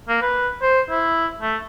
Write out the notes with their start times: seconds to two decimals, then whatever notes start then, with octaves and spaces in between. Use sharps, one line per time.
0.09 A#3
0.22 B4
0.62 C5
0.90 E4
1.40 A3